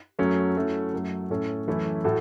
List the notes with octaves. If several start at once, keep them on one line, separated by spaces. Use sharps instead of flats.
F#2 F#3 A3 C#4
F#3 A3 C#4 E4
F#2 F#3 A3
A2 A3 C#4 A4
F#2 E3 A3 C#4 E4
A2 A3 F#4 A4